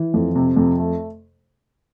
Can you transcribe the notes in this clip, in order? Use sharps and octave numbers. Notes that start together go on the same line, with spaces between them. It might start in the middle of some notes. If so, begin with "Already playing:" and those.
Already playing: E3
F2
C3
F2
A3